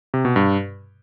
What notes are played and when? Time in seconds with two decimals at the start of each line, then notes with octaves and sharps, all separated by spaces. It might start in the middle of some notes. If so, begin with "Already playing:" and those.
0.14 C3
0.25 B2
0.36 G2